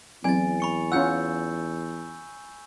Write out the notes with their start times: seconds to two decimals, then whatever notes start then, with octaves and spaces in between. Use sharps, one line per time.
0.24 E2 F#3 C4 E4 G#5 A6
0.60 B5 C#6 C#7
0.92 C#4 F4 F#5 E6 G6